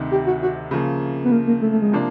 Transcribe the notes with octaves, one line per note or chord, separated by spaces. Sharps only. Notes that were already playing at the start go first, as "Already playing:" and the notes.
Already playing: D2 C3 D#3
G4
F#4
F#4
C#3 F3 A#3
B3
A#3
A#3
A3
A3
G#3
C3 F3 A#3 D4